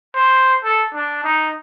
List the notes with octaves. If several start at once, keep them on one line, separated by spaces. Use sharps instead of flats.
C5
A4
D4
D#4